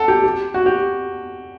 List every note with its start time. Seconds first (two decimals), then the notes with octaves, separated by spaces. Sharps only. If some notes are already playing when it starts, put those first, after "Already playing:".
Already playing: A4 F#5
0.08 G4
0.24 G4
0.54 F#4
0.66 G4